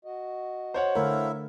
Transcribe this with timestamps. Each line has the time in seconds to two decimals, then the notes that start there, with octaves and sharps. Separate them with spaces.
0.05 F#4 D#5
0.74 C5 C#5 F#5
0.95 D3 A3 E4 A4 A#4 E5 F5